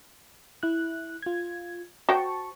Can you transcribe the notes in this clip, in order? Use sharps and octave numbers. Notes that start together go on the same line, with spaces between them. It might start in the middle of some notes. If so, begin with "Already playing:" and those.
E4 F#6
F4 G#6
F#4 C5 G5 A5 C#6